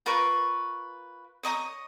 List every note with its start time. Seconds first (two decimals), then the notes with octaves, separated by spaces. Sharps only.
0.06 F4 A#4 B4 C#6
1.43 C#5 D#5 A#5 D#6